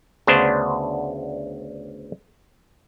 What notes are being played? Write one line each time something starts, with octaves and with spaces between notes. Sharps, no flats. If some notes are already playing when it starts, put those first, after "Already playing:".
D2 C#3 B3 D4 C5